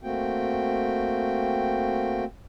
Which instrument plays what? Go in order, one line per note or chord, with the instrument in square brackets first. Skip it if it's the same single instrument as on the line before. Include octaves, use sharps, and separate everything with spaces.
[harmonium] A3 A#3 C4 F#4 G5